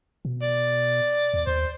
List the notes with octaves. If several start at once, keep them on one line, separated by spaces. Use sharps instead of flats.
B2
D5
E2
D#2 C5